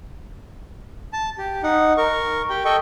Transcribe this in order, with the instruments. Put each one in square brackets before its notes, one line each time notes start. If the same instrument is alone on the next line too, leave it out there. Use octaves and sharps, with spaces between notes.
[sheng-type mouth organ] A5
G4
D#4 F#5
A#4 C#6
G4 G5
A4 D#5 G5 C#6